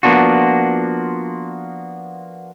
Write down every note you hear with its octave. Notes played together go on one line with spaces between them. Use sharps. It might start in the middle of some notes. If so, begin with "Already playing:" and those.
F3 A#3 B3 D4 F4 F#4